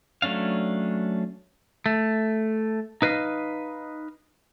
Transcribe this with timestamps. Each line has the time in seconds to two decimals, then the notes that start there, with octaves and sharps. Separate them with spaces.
0.22 F#3 A3 C#4 D4 F5
1.86 A3
3.02 D#4 B4 D#5 F5